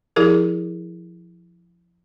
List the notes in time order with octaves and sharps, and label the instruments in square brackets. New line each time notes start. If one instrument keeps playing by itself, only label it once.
[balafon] F3 E4 G4 G#4 A#4